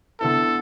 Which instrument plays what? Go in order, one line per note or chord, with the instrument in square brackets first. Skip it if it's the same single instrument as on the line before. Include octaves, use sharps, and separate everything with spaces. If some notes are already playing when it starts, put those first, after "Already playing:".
[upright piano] D3 B3 E4 [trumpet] A4